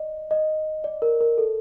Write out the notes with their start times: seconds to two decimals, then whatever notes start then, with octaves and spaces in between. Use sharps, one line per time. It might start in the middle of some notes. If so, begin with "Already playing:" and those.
Already playing: D5 D#5
0.31 D#5
0.84 D5
1.02 A#4
1.21 A#4
1.38 A4